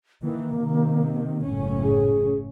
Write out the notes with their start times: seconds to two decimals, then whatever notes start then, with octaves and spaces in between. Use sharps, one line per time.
0.23 D#3 E3 A#3
0.57 C3 D#3
1.46 F#1 A2 C#4
1.83 G#4